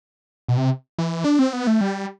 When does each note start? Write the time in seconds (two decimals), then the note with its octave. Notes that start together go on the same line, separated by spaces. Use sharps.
0.48 B2
0.57 C3
0.98 E3
1.24 D4
1.39 C4
1.53 B3
1.67 A3
1.81 G3